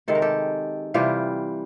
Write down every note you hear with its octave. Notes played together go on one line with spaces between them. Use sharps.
C3 D#3 G#3 A4
A#4
G4 A4
C3 E3 G3 F4 G4